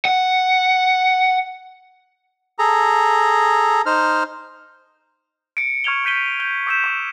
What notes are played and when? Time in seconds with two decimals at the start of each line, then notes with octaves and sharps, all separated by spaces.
0.05 F#5
2.59 G#4 A4 A#5
3.86 D#4 C5 F6
5.57 C#7 D7
5.84 C#6 F6 G#6 C#7 F7 G7
6.04 C#6 G6 B6 D#7 G7
6.39 G6 G7
6.67 D6 E6 G6 B6 E7
6.84 C#6 D6